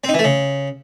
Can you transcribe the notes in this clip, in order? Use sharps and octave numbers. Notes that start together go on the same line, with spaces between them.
C4
D#4
E3
A3
C#3